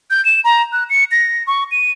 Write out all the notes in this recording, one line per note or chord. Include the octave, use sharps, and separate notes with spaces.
G6
E7
A#5
F#6
C#7
A#6
C#6
D#7